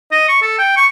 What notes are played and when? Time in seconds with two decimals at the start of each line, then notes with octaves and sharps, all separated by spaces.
0.12 D#5
0.29 C#6
0.42 A4
0.59 G5
0.77 C#6